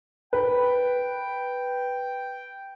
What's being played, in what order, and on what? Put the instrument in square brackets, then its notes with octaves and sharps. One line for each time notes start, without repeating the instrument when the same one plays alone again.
[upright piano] B4 [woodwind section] G5